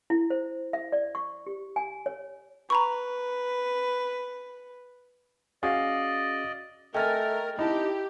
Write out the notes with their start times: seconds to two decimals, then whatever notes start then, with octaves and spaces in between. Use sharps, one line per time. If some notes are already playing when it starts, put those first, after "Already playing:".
0.10 E4
0.30 C5
0.73 E5
0.92 D5
1.15 C#6
1.46 G4
1.76 G#5
2.06 C#5
2.70 B4 A#5 B5 C#6
5.63 C#4 F#4 G#4 D5 D#5 F5
6.94 A3 A#4 D#5 G5 G#5 F6 A6
7.59 D#4 E4 G4 A5